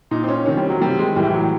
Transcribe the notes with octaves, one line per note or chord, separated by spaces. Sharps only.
A#2 D#4
C4
C#4
C3 D#3 C#4
G3
F#3
C3 D#3 G3
G#3
A2 E3 G3
F#3